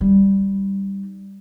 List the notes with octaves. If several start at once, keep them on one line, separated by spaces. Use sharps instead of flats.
G3 D#4